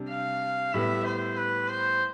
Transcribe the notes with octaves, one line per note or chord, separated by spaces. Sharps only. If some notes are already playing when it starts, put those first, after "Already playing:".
Already playing: C3 G3 D4
F5
A2 G3 B3 E5
C5
B4
C5